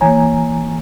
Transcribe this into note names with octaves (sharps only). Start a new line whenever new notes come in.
E3 A#3 C#5 G#5 A#5